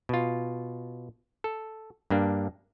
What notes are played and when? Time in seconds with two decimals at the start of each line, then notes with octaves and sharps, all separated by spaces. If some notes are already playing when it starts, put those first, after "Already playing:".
0.09 B2 F4
1.44 A4
2.10 G2 A#3 D4